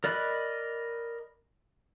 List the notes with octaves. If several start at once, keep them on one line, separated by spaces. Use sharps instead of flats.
A#4 D5 D#5 B5 F#6